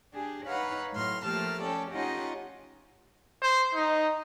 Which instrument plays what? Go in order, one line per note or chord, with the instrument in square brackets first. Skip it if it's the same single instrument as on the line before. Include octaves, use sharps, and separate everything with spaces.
[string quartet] D4 G4 G#4
D#4 B4 C#5 F5 F#5 B5
A2 F#3 C6 F6
F3 A3 A#3 G4 A5 F6
C#4 A4 D5 G5
C#4 D#4 F4 G4 D#5 F#5
[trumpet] C5
D#4